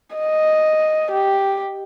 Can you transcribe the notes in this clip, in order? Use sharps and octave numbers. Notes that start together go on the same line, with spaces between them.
D#5
G4